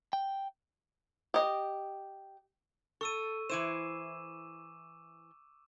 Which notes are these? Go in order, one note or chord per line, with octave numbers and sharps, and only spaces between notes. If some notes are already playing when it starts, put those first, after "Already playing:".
G5
G4 D#5
A4 C#6 E6 D#7
E3 E4 C5 D6 D#7 E7